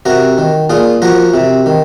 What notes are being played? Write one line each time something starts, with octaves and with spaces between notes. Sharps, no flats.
C3 F#4 A#4
D#3
A#2 F4 G#4
F3 F#4 A#4
C3
D#3